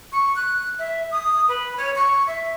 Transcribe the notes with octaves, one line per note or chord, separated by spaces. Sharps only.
C#6
F#6
E5
D#6
B4
C#5
C#6
E5